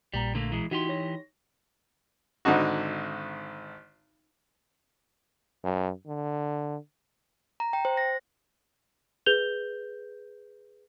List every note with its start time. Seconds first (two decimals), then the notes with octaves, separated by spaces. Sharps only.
0.14 A#1 A#2 G3 A#5
0.35 D3 A3 A#3
0.52 E3 G#3
0.71 E3 D#4 F#4 G4 C6
0.88 D#4 C#5 A#6
2.45 G#1 D3 D#4 F#4
5.64 F#2
6.07 D3
7.60 A#5
7.73 G5
7.85 C5
7.97 A#6
9.26 G#4 B4 G6 F7 G7